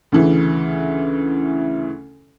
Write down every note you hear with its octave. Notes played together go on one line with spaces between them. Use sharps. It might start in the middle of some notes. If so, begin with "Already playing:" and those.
D2 C#3 E3